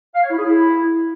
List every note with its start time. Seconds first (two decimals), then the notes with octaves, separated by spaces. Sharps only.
0.15 F5
0.23 C#5
0.30 E4
0.38 G#4
0.46 E4